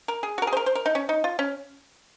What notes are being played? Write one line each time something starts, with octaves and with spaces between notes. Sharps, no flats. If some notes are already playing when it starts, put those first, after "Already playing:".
A#4
G#4
F#4 A#4
G#4
C5
A#4
C5
A#4
D#4
C#4
D#4
F4
C#4